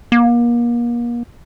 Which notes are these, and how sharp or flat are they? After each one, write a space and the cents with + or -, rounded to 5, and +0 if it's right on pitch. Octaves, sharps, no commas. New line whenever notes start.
A#3 +35